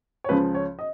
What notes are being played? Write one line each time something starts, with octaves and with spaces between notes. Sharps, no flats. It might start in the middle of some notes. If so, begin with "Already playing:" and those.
C#5
C#2 C#3 F3 B4
C#5
D#5